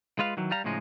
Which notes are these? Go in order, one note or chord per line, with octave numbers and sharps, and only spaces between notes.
G#3 F4 B4 F5
D#3 E3 F#3
G3 F5 A#5
A2 C#3 F3 G#3 D#4